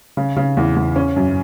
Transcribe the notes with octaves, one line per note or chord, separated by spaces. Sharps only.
C#3
C#3
E2
E2
C#4
F#2